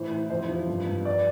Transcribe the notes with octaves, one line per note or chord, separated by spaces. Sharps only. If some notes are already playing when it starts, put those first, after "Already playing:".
Already playing: A2 E3 C5
E3
F2 C5
F3
G2
G2
D5